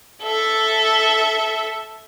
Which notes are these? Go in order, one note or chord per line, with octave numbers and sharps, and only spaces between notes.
A4 E5